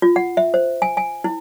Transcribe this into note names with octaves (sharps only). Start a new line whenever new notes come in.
F4
F#5
E5
C5
G#5
G#5
E4